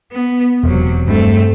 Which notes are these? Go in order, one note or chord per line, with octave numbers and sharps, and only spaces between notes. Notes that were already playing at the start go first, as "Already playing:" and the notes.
B3
E1 C3 F#3
G2 A3 C4